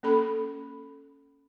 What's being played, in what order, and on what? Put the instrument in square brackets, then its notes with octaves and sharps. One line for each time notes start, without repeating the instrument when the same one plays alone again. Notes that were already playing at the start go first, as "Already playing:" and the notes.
[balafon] A#3 C#4 A4 B5